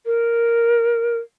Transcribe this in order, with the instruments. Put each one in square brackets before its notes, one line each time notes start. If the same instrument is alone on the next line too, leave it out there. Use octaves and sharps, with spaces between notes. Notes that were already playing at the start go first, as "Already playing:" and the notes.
[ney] A#4